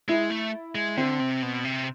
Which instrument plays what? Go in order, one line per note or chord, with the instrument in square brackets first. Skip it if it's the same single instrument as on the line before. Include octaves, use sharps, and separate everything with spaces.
[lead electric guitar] G#3 [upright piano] E4
[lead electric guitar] A3
G#3
[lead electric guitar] D3 [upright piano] C4
[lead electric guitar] C3
B2
C3